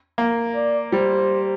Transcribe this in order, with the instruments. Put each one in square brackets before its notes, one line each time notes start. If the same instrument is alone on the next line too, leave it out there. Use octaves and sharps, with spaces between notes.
[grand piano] A#3
[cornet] D5
[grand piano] G3 [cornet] C5